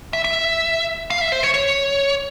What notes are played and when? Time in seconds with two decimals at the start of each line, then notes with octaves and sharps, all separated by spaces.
0.13 E5
0.24 E5
1.10 F5
1.21 E5
1.32 C5
1.43 C#5
1.54 C#5